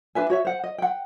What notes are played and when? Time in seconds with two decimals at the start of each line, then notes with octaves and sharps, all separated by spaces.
0.15 D4 B4 E5 G#5
0.30 F#4 C#5 E5
0.45 C5 F#5
0.64 D#5
0.78 F#5 G5